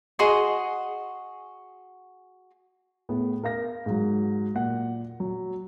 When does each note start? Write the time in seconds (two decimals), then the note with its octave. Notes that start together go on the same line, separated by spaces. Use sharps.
0.19 F#4 G#4 D#5 C6
3.09 A2 B3 G#4
3.43 A#4 F5 A#6
3.86 G#2 F#3
4.55 A#2 F#5
5.20 F#3